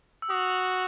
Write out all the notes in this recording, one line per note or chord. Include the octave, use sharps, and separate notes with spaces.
E6
F#4 D#6